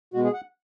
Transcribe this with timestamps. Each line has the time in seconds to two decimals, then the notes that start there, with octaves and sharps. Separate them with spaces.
0.14 B2 G#3 B3 F#4
0.24 G#4
0.34 F#5